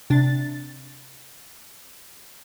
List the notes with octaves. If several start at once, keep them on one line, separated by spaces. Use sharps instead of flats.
C3 D4 A6